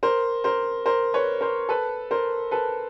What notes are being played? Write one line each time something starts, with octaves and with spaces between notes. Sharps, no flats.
A#4 C5
A#4 C5
A#4 C5
B4 C#5
A#4 C5
A4 B4
A#4 C5
A4 B4